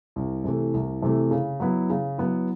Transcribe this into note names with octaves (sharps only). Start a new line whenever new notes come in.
C2
C3 E3 A3
C2
C3 E3 A3
C#3
F#3 B3 E4
C#3
F#3 B3 E4